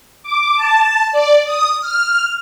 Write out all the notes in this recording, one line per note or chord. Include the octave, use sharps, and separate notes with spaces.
D6
A5
D5
D#6
F6